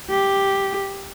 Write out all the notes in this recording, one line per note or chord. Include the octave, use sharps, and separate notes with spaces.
G4